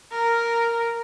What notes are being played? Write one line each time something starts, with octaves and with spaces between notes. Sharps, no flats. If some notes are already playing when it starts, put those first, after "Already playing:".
A#4